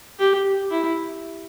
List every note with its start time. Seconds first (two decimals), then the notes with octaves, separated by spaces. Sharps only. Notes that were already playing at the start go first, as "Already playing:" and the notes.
0.19 G4
0.71 E4